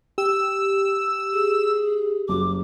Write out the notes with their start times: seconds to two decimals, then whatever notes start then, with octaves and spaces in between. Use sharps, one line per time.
0.18 G4 E6
1.33 G#4
2.29 F#1 F#4 D6